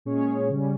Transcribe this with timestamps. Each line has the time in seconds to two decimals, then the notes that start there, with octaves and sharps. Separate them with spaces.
0.05 A#2 G#3 C#4 G#4 C#5
0.49 C#3 G3 C#4